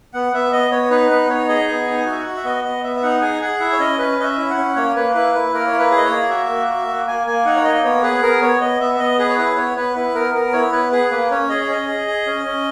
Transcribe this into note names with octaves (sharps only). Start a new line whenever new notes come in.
B3 F#5
B3 E5
B3 D#5
B3 C#5
D#4 B4
B3 B4
D#4 C#5
G#4 D#5
B3 G#5
D#4
G#5
F#4 E5
F#5
F#4
E5
B3 D#5
B3 D#5
B3 E5
E5
D#4 F#5
G#4 G#5
G#4 F#5
E4 E5
C#5
C#4 D#5
C#4 B4
C#4 D#5
E5
E4
F#5
C#4
A#3 C#5
A#3 B4
E4 B4
E4 B4
A#3 A#4
C#5
E4
B4
G#4
D#5
C#5
A#3
F#4 E5
A#3
F#4
A#3
A#3 G#5
A#3 G#5
D#4 F#5
C#5
A#3 D#5
B3 C#5
G#4 B4
B3 A#4
B3 C#5
B3 D#5
B3 E5
E5
B3 D#5
G#4 B4
C#5
E4 B4
B3 C#5
B3 B4
E4 B4
B3 A#4
B3 A#4
E4 C#5
B3 B4
G#4 B4
A#3 B4
C#4 C#5
G#4 D#5
C#5
C#4 D#5
G#4
G#4
C#4
C#4